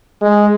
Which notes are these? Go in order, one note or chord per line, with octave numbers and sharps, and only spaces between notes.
G#3